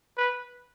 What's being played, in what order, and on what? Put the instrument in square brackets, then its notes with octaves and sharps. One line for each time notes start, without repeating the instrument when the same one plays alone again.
[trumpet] B4